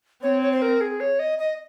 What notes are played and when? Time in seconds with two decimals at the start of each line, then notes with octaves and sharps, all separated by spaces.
0.23 C4 C#5
0.42 C#5
0.52 C5
0.62 A#4
0.81 G#4
1.00 C#5
1.19 D#5
1.39 D#5